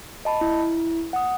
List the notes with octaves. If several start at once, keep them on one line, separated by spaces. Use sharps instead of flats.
D#5 A5 B5
E4
F#5 D#6